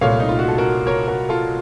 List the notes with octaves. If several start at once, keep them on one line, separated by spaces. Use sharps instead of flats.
C2 A#2 A3 C#5 F5
D#4
F4
F#4
A4
F#4 A#4
A#4 C#5
F#4 A#4
F4 A4